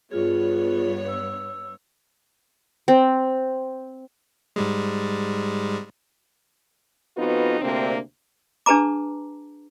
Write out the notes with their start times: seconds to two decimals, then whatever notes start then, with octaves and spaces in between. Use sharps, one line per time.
0.11 G2 B3 F4 G#4 C#5
1.08 E6
2.88 C4
4.56 G#2 G3 G#3
7.17 F2 B3 D#4 F4 F#4 B4
7.61 D2 C3 A#3 C4 D4
8.66 D4 G#4 B4 A5 A#5 D6